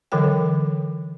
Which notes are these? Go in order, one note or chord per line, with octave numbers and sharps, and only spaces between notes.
D3 E3 F#3 A4 A#4 G5